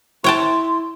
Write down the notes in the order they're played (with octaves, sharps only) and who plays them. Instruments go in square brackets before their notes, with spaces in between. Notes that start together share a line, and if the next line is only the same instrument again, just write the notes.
[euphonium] E4 [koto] C#5 G5 A5 [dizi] C6